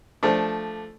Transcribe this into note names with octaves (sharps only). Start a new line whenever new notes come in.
F3 A3 D4